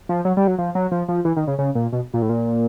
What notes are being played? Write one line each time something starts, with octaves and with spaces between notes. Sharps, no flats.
F3
F#3
G3
F#3
F3
F#3
F3
F3
E3
D#3
C#3
C#3
A#2
B2
A#2
A2
A#2